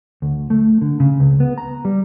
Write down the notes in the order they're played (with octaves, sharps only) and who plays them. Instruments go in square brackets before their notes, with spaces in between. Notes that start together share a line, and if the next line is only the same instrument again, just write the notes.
[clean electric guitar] D2
A3
D3
C#3
C#2
B3
A#5
G3